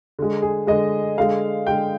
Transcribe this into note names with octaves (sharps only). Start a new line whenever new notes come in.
D3 G#3
G#4
D3 G#3 D#5
D3 G#3 F5
D3 G#3 G5